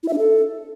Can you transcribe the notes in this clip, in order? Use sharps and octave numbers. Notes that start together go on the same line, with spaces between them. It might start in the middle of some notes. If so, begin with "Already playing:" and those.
E4
E5
D4
A4